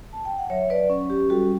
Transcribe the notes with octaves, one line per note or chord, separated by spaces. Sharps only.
A5
G5
F#5
F#3 C#5 E5
B4 D5
C#4
G4
G3 F#4 A4